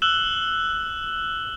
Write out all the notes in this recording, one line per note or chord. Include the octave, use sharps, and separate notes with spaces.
E6 F#6 E7 F#7 G7